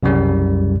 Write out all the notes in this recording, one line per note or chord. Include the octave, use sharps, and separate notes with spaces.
C2 F#2 C#3 G3